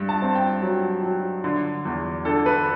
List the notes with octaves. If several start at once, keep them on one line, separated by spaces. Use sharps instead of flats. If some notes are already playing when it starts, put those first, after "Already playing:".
Already playing: G2
A5
C4
G5
F#3
F#3
D3
E2
D3 A4
B4